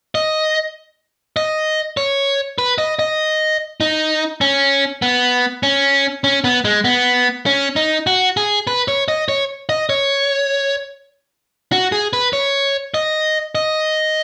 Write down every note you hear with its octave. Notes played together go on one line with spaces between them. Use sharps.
D#5
D#5
C#5
B4
D#5
D#5
D#4
C#4
B3
C#4
C#4
B3
G#3
B3
C#4
D#4
F#4
G#4
B4
C#5
D#5
C#5
D#5
C#5
F#4
G#4
B4
C#5
D#5
D#5